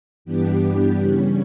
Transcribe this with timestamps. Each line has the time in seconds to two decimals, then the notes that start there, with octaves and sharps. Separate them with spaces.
0.25 G2 E3 B3 D4 G4
0.99 C#3 G3 C#4